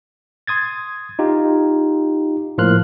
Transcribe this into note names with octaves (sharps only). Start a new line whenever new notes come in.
C6 D#6 G#6 A6
D#4 F4 G4
A2 F3 A#3 C6 F6 F#6